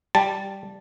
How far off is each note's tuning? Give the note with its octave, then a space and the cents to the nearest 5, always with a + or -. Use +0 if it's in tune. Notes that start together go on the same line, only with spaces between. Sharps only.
G3 +0 A5 +0